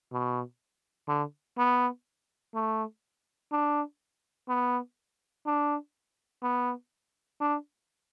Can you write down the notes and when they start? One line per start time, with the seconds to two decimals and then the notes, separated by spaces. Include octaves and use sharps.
0.12 B2
1.08 D3
1.58 B3
2.54 A3
3.52 D4
4.49 B3
5.46 D4
6.43 B3
7.41 D4